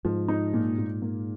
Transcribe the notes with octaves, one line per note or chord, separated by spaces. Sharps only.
G#2 F3
D#4
A#2
A#2
A#3